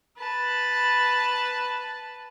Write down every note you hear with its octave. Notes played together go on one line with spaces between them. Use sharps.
B4 A5 B5